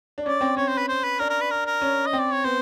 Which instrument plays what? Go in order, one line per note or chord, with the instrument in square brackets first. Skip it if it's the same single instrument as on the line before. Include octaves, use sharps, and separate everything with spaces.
[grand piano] D4
[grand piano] C#4 [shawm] D5
[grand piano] C4
[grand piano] C#4 [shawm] C#5
[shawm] C5
B4
C5
B4
[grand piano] D4 [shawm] A#4
[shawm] A#4
B4
A#4
A#4
[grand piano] C#4
[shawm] D#5
[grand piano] C4
[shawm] D5
C#5
[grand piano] B3 [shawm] C5